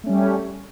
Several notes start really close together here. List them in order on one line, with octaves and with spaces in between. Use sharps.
A3 C#4 G3